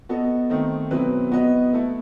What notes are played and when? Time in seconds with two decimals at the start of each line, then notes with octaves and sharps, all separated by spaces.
0.09 B3 F#4 A4 D#5
0.50 D#3 A3 C4
0.91 B2 F#3 C4 E4 B4
1.31 B3 F#4 B4 D#5
1.73 A3 E4 A4